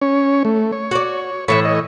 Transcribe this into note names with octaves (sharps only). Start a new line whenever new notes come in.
C#4 C#5
A3
C#5
F#4 D5
A2 E3 C#5 E5 B5 C#6
C#5 D#5